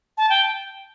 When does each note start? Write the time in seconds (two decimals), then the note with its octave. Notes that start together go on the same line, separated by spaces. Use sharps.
0.17 A5
0.30 G5